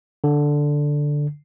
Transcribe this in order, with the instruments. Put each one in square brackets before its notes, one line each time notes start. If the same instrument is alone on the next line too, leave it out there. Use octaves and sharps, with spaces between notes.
[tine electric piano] D3